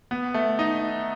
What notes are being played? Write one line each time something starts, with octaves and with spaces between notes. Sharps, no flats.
B3
A3
D#4